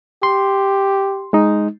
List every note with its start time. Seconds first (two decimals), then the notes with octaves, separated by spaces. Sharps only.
0.23 G4 C6
1.33 G#3 D#4